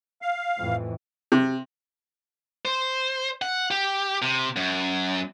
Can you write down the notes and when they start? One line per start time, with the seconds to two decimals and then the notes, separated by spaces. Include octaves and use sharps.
0.22 F5
0.60 F2 A2 E3
1.32 C3
2.65 C5
3.42 F#5
3.71 G4
4.22 C3
4.56 F#2